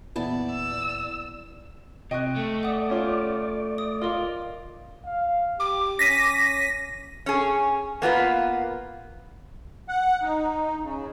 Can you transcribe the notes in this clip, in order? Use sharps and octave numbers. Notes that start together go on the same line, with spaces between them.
E2 A#2 B3 E4 D5 A5
E6
C3 D#5 G5 C#6 F#6
A3
D5 F#5 D#6
C#4 F4
D#6
F4 A#4 D#5 F5 C6
F5
G4 D6
C#4 A#6 B6 D#7
C#4 G#4
A#3 B3 F4 B4
F#5
D#4
C#3